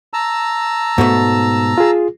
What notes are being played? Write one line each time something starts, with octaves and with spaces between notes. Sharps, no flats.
A5 A#5 E6
G#2 B2 A3
F4 G#4